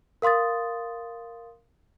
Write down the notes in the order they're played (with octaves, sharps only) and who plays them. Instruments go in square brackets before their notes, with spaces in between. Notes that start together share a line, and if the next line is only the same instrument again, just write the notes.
[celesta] A#4 F5 C6 D#6 A6